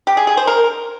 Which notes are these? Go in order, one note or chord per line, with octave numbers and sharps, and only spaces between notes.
G4
G#4
G#4
C5
A#4